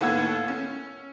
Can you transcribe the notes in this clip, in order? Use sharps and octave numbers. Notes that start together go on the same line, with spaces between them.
D#2 A2 B3 F#5 E6 G#6
C#4